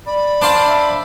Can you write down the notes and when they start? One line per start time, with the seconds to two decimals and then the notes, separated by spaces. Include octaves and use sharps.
0.06 D5 B5
0.42 D4 C5 F5 A5
0.68 E5